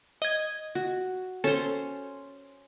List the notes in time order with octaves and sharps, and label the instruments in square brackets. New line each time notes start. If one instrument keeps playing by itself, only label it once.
[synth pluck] D#5 G#6
[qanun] F#4
[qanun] C#4 C5 [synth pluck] A4